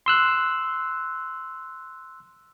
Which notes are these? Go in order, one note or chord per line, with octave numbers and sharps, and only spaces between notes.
C6 E6 F#6